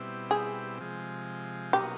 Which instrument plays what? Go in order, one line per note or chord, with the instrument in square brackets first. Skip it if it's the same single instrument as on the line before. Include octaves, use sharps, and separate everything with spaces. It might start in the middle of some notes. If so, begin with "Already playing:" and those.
Already playing: [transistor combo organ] B2 G3 C4 E4
[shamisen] G#4
[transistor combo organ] C3 F3 G#3
[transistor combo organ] B2 F#3 A#3 D#4 [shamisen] G4